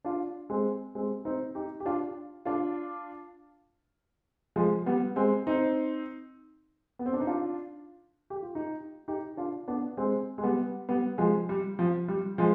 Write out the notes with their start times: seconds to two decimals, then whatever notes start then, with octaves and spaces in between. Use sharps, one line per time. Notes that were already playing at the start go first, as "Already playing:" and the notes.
0.05 D4 F4
0.50 G#3 C4
0.95 G#3 C4
1.25 C4 D#4
1.55 D#4 G4
1.80 G4
1.86 D4 F4
2.45 D4 F4
4.56 F3 G#3
4.86 G3 B3
5.16 G#3 C4
5.47 C4 D#4
6.99 B3
7.06 C4
7.13 D4
7.20 D#4
7.27 D4 F4
8.30 G4
8.42 F4
8.55 D#4 G4
9.08 D#4 G4
9.37 D4 F4
9.68 B3 D4
9.97 G#3 C4
10.38 G#3
10.43 G3 B3
10.89 G3 B3
11.18 F3 G#3
11.49 G3
11.79 F3
12.08 G3
12.38 F3 G#3